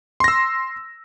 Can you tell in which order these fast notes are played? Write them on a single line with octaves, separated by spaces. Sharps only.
C6 A#6 E6